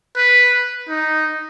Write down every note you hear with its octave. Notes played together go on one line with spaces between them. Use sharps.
B4
D#4